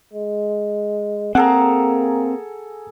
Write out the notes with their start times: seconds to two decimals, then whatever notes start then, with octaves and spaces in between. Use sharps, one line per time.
0.14 G#3
1.35 A#3 C4 G#4 A4 F#5 A#5